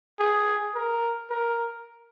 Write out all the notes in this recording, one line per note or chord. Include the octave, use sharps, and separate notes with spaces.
G#4
A#4
A#4